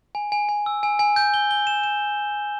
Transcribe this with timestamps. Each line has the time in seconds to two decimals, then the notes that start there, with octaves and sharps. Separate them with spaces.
0.15 G#5
0.32 G#5
0.49 G#5
0.66 E6
0.83 G#5
0.99 G#5
1.16 G6
1.34 G7
1.51 G7
1.67 E7
1.84 E7